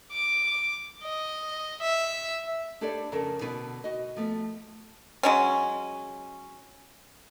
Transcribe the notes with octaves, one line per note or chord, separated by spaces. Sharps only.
D6
D#5
E5
D4 G4 A4 B4 C#5 D5
F2 C#3 A4 A#4 A5
B2 D3 B3 B4
F#4 D#5
F3 A3 B3
F#3 G#3 C#4